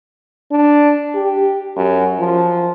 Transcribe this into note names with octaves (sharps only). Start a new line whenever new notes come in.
D4
G4
F#2
F3